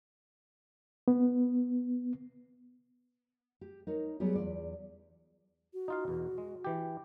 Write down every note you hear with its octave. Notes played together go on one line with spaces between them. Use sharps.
B3
G4
D#4 A#4 C#5
F#3 G3 B3 G4 G#4
E2 A#2 F4 D5
F#4
D#4 F4 F5
E2 B2
G#3
E3 G4